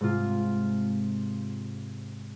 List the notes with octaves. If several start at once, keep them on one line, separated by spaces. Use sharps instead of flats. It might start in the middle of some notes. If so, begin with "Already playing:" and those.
G#2 C3 F4